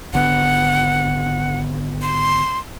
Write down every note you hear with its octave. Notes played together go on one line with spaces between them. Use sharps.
G#1 D3 B3 F#5
C6